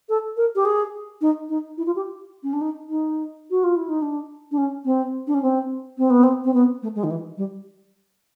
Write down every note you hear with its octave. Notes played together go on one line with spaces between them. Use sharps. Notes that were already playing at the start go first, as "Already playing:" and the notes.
A4
A#4
G4
G#4
D#4
D#4
E4
F4
G4
C#4
D4
D#4
D#4
F#4
F4
E4
D#4
D4
D4
C#4
C4
D4
C#4
C4
C4
B3
C4
C4
B3
A3
G#3
D#3
E3
G3